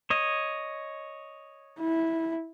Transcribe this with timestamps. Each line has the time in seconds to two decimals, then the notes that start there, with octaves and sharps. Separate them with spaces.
0.10 C#5 D#5
1.80 E4